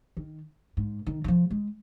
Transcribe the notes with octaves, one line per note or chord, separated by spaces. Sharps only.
D#3
G#2
D#3
D#3
F3
G#3